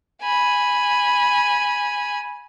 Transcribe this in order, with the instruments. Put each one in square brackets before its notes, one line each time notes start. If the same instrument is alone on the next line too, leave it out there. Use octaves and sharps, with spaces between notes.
[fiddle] G#5 B5